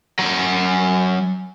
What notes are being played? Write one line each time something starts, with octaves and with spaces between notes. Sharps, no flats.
F#3 G#5